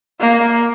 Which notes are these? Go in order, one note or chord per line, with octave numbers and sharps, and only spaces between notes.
A#3